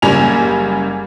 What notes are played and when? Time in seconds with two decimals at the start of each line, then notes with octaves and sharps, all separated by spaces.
0.02 F#1 C#3 G3 A#3 G#5 F7